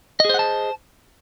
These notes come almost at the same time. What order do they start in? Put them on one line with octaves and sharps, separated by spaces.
D#5 G#4 C5 F#5 A5